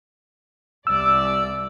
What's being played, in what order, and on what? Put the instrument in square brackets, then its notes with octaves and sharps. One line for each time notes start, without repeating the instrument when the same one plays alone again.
[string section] C2 D5 [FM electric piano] E6